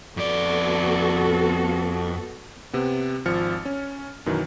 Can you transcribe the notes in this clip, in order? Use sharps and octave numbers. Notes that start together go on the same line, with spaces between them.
F2 B3 F#4 A4 D5
C3 B3
G#1 F3 F6 A6 C#7
C#4
F#2 B2 D#3 E3